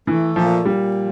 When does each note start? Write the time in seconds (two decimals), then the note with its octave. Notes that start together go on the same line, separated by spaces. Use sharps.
0.07 E3 A3
0.36 A#2 F3
0.65 A#2 G3
0.95 F3